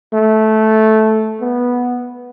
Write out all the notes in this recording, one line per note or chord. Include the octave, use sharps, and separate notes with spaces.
A3
B3